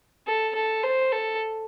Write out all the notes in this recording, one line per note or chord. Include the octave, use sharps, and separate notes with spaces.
A4
A4
C5
A4